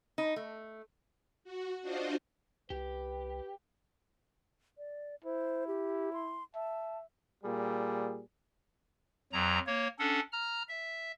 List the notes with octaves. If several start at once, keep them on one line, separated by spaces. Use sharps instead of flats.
D#4
A3
F#4
D4 F4 F#4 C5 D#5
C2 G4 B4
D5
E4 C5
G4
C6
E5 A5
A#2 G3 G#4
F2 F#3 A#5
A#3 C#5
C#4 D4 A4 F#5
A#5 F6
E5